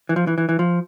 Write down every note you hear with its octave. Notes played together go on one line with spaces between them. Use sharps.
E3
F3
E3
E3
E3
F3